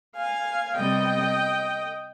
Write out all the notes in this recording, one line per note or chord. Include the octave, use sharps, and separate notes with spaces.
F5 G#5
C3 G3 B3 D#5 G5